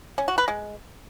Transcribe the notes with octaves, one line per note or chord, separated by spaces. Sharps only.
C#4
F#4
B4
G#3